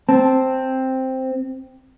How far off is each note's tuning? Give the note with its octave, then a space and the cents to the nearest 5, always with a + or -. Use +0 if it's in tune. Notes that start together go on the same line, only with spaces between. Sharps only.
C4 +0 A5 +0